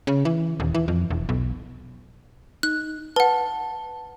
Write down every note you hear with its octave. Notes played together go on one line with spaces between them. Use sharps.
C#3
E3
D#1
E3
F2
E1
B1
D#4 F#6
B4 F#5 A5